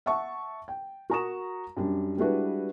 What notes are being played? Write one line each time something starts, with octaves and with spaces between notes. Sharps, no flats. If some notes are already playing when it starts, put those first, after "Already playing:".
E5 F#5 A5 C#6
G5
F#4 A#4 A#5 C#6 D#6 E7
F#2 G3 D4
G3 G#3 D4 E4 F#4 B4